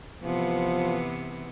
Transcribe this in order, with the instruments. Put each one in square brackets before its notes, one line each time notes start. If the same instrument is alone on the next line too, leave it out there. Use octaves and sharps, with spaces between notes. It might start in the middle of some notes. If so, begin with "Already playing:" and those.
[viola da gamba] C3 E3 B3 [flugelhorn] F3